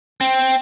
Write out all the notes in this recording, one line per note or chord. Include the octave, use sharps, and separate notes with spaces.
C4